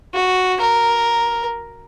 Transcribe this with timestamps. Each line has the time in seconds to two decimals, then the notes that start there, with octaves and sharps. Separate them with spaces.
0.14 F#4
0.60 A#4